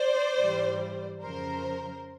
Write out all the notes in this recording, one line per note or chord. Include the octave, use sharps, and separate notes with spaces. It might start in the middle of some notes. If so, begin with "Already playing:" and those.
Already playing: C5 D5
G#2 E3 G3
F2 C#3 F3 A#4 C5